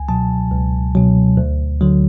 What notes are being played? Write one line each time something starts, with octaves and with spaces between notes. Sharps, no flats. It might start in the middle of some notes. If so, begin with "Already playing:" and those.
Already playing: C#2 G#5
B2 F#3 A5
C#2
B2 F#3
D2
D3 F#3